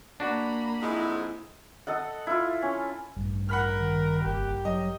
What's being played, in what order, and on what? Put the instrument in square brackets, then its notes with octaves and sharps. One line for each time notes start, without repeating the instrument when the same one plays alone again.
[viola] A#3 B5 [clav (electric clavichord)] D4 F#4
[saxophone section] F2 G#2 G#3 [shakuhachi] E4
[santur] A4 D#5 F#5
E4 F4
C#4
[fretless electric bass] A1 G2
[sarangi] A#4 [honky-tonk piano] F#5 B5 F6
[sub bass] D#3
[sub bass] F#1 [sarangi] G4
[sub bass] F#3 [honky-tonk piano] D#5